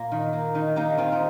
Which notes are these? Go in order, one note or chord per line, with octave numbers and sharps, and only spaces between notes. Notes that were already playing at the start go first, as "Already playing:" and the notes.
Already playing: A#2 A#3
D#3
A#3
D#3 D#4
A#3 D#4 G4
D#3 C4 F4
D#4